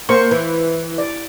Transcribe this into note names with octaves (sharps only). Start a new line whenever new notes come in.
A#3 C5 C#6
E3
D5